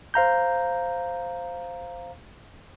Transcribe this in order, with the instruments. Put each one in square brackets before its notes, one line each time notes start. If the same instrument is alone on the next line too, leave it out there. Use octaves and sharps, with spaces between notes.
[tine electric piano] C5 F5 A#5 G6